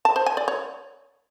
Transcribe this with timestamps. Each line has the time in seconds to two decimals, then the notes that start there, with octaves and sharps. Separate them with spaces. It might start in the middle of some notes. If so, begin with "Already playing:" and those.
0.05 A5
0.16 C5
0.26 G#5
0.37 D5
0.48 C#5